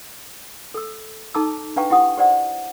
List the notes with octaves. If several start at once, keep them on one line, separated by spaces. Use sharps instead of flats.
A4 E6
D#4 A4 A5 A#5 D6 E6
D4 B4 F5 G5 A#5 C#6
E4 G4 F#5 D#6
G4 C5 D5 F#5